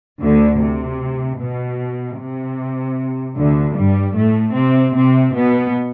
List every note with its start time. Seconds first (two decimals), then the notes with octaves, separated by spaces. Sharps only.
0.20 D2 D3
0.60 C3
1.39 B2
2.18 C3
3.36 D2 D3
3.75 G2 G3
4.15 A2 A3
4.55 C3 C4
4.94 C3 C4
5.34 B2 B3